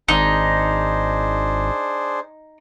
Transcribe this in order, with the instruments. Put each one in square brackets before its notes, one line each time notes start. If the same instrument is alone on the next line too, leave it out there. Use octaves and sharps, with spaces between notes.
[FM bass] G#1 [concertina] D4 G#4 C5 [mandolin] D#4